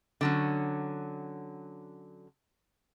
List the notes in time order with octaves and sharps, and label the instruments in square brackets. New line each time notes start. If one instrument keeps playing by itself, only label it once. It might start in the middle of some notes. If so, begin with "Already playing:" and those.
[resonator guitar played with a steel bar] D3 F#3 C#4